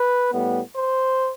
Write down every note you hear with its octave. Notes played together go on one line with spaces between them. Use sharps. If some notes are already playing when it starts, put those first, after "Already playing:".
Already playing: B4
A2 G3 B3
C5